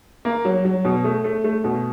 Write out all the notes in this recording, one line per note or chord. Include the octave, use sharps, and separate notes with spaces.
A#3
F#3
F#3
B2
A3
A3
A3
B2